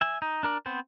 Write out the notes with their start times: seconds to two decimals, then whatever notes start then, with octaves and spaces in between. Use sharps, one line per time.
0.01 E5 G#5
0.22 D#4
0.43 D4 A#4 D5
0.66 B3 C4 C5